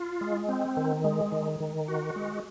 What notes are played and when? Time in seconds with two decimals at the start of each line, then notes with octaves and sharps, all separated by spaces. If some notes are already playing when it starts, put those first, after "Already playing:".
Already playing: F4
0.21 G#3
0.49 C4
0.77 D#3
1.04 G#3
1.32 D#3
1.60 D#3
1.88 F#4
2.16 G#3